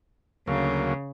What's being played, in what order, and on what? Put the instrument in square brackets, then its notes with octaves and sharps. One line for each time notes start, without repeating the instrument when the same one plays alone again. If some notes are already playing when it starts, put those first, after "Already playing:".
[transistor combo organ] D2 F#3 A#3 [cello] C#3